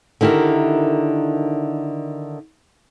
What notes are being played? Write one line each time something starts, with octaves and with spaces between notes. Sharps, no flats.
D3 D#3 E4 G4 A#4